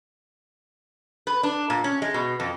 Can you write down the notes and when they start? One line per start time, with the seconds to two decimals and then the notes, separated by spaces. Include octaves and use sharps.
1.27 B4
1.43 D4
1.70 A#2
1.84 C#4
2.02 G#3
2.14 B2
2.40 F2